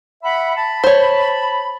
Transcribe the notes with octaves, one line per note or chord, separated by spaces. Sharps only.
E5 F#5 B5
A5 B5
C5 C#5